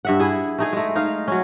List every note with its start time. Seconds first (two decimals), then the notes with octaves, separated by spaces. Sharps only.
0.05 G2 E5 F#5
0.19 E4 G#4
0.58 A3 D#4 G#4
0.73 G#3 A3
0.96 D#4 F5
1.28 F#3 C#4